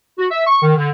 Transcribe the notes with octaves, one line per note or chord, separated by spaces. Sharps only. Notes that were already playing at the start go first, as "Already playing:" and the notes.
F#4
E5
C#6
D#3
D3